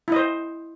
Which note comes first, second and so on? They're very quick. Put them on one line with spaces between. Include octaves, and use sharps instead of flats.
E4 D#5 C5